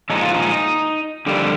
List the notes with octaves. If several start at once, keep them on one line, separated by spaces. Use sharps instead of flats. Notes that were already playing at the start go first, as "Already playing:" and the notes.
A#2 F3 G#3 D#4
F4
D#4
F2 D3 G3 A#3 G4